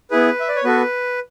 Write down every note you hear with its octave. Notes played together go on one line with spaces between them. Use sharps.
B3 E4 G#4 B4
E5
D5
C#5
B3 F#4 A4 B4